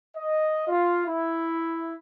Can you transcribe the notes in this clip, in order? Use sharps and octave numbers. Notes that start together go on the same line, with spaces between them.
D#5
F4
E4